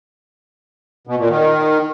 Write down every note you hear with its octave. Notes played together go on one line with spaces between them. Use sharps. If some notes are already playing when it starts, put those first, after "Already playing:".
B2
A#2
D#3